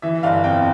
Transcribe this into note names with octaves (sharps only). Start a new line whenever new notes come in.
E3 E5
G1 F5
F2 G5